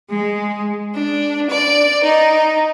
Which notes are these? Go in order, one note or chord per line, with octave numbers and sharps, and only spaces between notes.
G#3
D4
D5
D#4